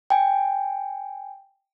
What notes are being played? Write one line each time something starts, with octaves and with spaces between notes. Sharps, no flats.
G5 G#5